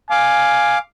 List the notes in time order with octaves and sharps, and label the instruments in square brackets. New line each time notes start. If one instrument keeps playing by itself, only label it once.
[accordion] F5 D6 [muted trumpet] G#5